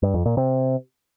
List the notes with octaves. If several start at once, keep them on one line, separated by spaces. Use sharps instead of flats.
G2
F2
A#2
C3